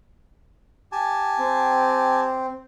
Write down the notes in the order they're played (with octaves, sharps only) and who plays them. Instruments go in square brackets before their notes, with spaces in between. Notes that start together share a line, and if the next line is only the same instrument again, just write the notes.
[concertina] G4 G#5 A5
[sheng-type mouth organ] C4